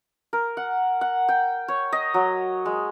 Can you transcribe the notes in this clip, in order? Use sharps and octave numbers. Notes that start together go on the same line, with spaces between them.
A#4
F#5
F#5
G5
C#5
D#5
F#3
G#3